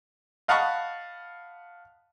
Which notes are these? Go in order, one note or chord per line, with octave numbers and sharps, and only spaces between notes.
D#5 F5 F#5 A5 B5 C#6